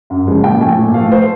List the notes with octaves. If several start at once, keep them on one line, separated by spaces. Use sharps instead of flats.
F#2
C#3 F3 G#3
A#2 G5
F3 A3 G#5
A#2
F3 A3 F5
C5